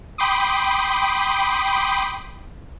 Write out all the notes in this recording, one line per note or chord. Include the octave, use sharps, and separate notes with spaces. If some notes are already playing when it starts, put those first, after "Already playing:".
G5 B5 C6 D6 D#6